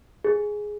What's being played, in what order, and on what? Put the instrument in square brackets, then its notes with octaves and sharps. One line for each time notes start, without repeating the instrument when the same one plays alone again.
[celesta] G#4